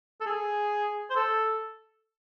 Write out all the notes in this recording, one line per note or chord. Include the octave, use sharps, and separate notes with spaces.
A4
G#4
C5
A4